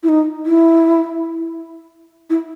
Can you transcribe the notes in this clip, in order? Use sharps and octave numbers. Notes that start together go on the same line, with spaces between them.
E4
D#4
E4
E4